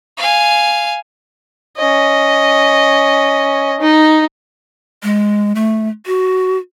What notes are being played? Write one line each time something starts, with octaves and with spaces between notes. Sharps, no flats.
F5 G#5
C#4 D#5
D#4
G#3
A3
F#4